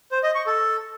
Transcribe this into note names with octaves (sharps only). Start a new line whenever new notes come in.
C5
D#5
C#6
A4